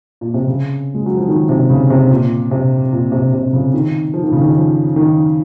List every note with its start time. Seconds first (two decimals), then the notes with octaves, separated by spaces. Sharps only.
0.21 A#2
0.34 C3
0.47 C#3
0.94 G#3
1.06 F#3
1.17 F3
1.28 D#3
1.49 C3
1.70 C#3
1.90 C3
2.10 A#2
2.51 C3
2.93 A#2
3.12 C3
3.33 C3
3.53 C#3
3.74 D#3
4.14 F3
4.23 D#3
4.32 C#3
4.41 D#3
4.55 F3
4.96 D#3